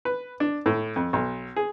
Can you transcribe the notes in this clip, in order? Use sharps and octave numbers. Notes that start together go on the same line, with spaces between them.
B4
D4
A2
F2
B1
G#4